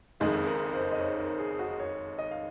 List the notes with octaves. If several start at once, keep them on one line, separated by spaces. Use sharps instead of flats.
F#1 F2 D#3 G#3 G#4
A#4
C5
D#5
C#5
A#4
G#4
F#4
C#5
D#5
F5